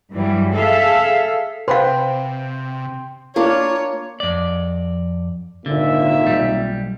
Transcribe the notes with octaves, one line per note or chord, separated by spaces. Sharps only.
G2 E3 F#3 G3
G#4 A4 E5 F5
C3 B4 C5 F5 G5 C6
A#3 D4 F4 C#5
F2 D5
G#1 A#2 D3 E5
B1 G3